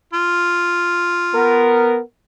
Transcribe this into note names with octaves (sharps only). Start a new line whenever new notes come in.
F4
B3 A#4